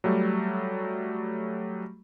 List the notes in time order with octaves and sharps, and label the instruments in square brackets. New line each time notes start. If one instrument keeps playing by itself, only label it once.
[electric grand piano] F#3 G3 A3